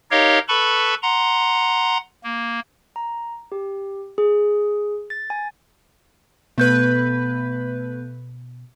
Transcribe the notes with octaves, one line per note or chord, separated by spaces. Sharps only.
D#4 G4 A#4 C#5 D#5 F5
A4 B4 A5 B5 C#6
F#5 A#5 C6
A#3
A#5
G4
G#4
A6
G#5
B2 A3 B3 B4 G6